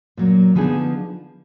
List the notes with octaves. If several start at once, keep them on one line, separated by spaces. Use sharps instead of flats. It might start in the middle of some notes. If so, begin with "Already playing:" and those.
A#2 F#3 A#3
D3 F3 B3 D#4 G#4